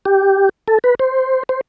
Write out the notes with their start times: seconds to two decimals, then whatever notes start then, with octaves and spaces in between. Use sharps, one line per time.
0.05 G4
0.68 A4
0.84 B4
0.99 C5
1.49 C5